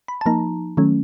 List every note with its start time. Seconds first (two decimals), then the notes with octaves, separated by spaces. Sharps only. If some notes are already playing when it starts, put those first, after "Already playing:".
0.08 B5
0.21 A5
0.26 F3 A#3 D#4 A#5
0.77 D#3 F#3 A3 C#4